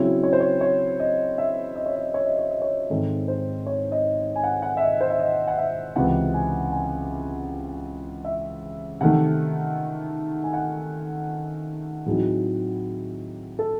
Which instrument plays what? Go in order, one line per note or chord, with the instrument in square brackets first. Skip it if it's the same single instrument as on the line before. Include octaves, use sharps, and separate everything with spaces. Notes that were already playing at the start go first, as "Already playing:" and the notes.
Already playing: [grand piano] C#3 F#3 C4 E4 C#5
C#5
C5
C#5
C#5
D#5
E5
D#5
C#5
D#5
C#5
D#5
C#5
D#5
C#5
G#2 D#3 G#3 C4 A4
C5
C#5
D#5
G#5
F#5
F#5
E5
D#5
C5
E5
D#5
F#5
E5
C#2 C3 E3 C4 F#5
G#5
G#5
E5
C3 D#3 A3 F#5
G#5
F#5
A2 F#3 C4 D#4 G#4
A4